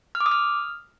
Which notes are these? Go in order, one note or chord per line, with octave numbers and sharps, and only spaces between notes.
F6
D6
D#6
F6